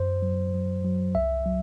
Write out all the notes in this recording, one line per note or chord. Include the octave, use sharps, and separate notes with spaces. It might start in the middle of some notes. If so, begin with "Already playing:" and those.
Already playing: F#2 C5
F#3
F#3
F#3
C2 E5
F#3